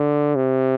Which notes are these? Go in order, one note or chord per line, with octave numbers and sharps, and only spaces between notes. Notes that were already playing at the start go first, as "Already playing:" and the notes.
Already playing: D3
C3